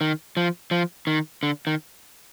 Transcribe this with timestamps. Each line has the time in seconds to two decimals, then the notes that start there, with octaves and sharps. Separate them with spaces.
0.01 D#3
0.37 F3
0.71 F3
1.07 D#3
1.43 D3
1.67 D#3